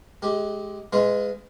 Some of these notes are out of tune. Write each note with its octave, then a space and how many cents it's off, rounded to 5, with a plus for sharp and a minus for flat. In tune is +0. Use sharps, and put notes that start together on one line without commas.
G#3 +25 G4 +0
G#3 +0 F4 -15 B4 +35